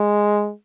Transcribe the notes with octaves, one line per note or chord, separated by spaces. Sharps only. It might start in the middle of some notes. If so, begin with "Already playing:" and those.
Already playing: G#3